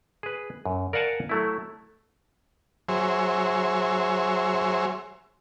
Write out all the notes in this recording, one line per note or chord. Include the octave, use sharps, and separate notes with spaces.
G#4 B4
F#2
A#4 D5 F5 F#5 G#5 A5
F#3 A3 E4
F#3 G#4 C5 C#5 E5